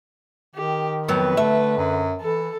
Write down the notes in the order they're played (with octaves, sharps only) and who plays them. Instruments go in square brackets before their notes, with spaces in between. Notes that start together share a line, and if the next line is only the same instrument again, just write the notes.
[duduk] D#3 [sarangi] G4
[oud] F2 F#3 B3 [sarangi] B4
[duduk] D3 [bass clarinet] A3 [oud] E5
[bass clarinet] F#2
[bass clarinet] E3 [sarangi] A4